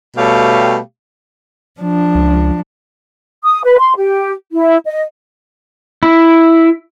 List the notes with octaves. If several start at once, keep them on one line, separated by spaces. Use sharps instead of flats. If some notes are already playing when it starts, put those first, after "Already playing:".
B2 G3 A3 G4 C#5 F5
F3 D4
C#2
D#6
B4
C6
G4
E4
D#5
E4